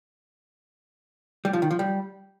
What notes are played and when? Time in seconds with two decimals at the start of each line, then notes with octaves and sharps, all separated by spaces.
1.45 G3
1.53 F3
1.62 D#3
1.71 F3
1.79 G3